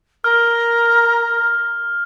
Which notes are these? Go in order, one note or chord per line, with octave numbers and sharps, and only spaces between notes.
A#4 F6